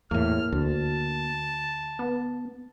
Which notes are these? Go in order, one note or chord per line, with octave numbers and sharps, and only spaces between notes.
E2 A2 A#3 F6
D2 A5
B3